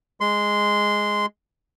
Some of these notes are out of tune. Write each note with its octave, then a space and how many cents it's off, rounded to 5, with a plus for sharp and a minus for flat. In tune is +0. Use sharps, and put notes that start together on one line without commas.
G#3 +0 C6 -15